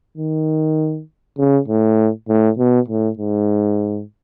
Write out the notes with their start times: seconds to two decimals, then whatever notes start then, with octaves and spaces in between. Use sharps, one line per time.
0.17 D#3
1.38 C#3
1.68 A2
2.28 A2
2.58 B2
2.88 A2
3.18 G#2